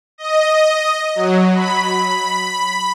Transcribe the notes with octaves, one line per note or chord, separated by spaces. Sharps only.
D#5
F#3
B5